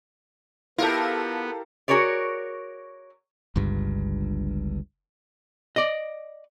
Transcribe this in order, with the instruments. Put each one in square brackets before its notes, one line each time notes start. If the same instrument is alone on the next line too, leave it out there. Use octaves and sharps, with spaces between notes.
[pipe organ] B3 [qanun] E4 [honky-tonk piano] F4 A4 [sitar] G4 A#4
[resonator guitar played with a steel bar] F#4 G#4 A#4 C#5 D5
[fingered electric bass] G1 C#2 G2
[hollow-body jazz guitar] D5 D#5